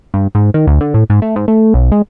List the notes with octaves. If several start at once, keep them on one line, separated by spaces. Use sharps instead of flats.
G2
G#2
D#3
D2
D3
A2
G#2
A3
G#2
A3
B1
G#3